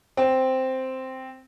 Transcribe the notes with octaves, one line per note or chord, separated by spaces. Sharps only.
C4